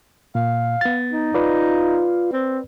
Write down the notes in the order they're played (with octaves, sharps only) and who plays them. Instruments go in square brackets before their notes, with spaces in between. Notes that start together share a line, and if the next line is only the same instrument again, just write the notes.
[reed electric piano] A#2 [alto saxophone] F5
[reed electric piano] B3 A6
[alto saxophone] D#4
[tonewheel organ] F4 [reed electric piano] B4 D5
[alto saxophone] C4